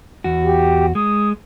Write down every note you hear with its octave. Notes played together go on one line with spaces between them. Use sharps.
E2 F#4
G4
G#3 D#6